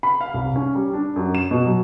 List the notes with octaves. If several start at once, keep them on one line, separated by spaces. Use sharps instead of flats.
B5
F5
C2
C#4
G3
D4
F#2
E7
B2
F#3